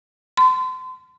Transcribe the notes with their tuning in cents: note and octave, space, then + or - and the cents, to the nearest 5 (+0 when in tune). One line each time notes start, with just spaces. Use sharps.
C6 -35